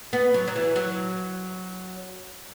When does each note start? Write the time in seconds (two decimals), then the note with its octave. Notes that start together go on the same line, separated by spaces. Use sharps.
0.13 B3
0.34 F#3
0.48 F#3
0.56 E3
0.76 F#3